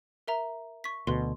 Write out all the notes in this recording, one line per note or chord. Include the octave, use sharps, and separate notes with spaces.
A#4 E5 A#5
C#6 B6
D2 B2 C6